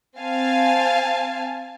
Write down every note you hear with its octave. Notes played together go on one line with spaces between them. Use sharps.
C4 F5 G#5 A5